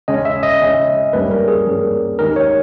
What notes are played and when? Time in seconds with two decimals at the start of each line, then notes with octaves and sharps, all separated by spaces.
0.08 C#3 G#3 C#4 D#5
0.25 E5
0.43 D#5
0.61 C#3 G#3 C#4
1.13 G2 G3 A#3 C#4 B4
1.31 A#4
1.48 G#4
1.66 G2 G3 A#3 C#4
2.19 D#3 G#3 D#4 G4 A#4
2.36 C#5